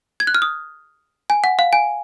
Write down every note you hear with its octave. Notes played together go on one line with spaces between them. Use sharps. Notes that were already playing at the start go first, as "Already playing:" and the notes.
G#6
F#6
F6
D#6
G#5
F#5
F5
G#5